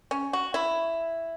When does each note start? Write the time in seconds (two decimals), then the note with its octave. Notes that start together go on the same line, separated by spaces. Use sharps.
0.11 C#4
0.33 F#4
0.54 E4